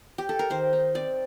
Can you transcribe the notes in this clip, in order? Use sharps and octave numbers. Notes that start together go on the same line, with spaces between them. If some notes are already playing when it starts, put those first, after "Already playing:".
G4
A4
A#4
D#3 C5
D#4
C4 D5